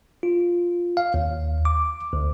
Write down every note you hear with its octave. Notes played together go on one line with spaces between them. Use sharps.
F4
F5
D#2
D6
D2